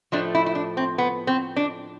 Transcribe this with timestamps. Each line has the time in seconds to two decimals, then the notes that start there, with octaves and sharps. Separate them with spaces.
0.12 A2 F3 A3 D4
0.35 E4
0.46 E4
0.55 D4
0.77 C4
0.98 B3
1.27 C4
1.56 D4